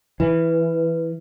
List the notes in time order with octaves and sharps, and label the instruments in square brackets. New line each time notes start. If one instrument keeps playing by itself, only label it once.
[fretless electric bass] E3 [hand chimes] B4